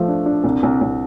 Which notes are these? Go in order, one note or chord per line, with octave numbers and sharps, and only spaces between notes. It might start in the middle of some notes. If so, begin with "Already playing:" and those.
Already playing: F3 A3
D4
D4
C2
C2
C2